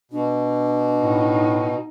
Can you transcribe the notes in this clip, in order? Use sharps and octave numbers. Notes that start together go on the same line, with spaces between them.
B2 D4
A2 D#4